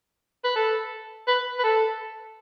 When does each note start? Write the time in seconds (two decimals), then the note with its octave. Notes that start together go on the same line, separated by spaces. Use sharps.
0.44 B4
0.56 A4
1.27 B4
1.59 B4
1.63 A4